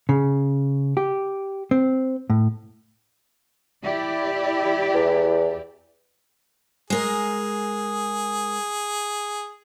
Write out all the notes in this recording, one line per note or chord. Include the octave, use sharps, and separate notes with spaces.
C#3
G4
C4
A2
E4 G4 D5
E2
G#3 G#4 A#4 D#5